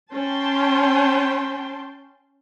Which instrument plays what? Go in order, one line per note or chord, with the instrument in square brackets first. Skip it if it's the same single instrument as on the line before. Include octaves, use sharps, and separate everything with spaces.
[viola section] C#4 G5 A5 C6